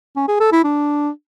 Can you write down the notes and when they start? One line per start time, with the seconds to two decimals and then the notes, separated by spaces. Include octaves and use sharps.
0.16 C#4
0.28 G#4
0.40 A4
0.52 E4
0.64 D4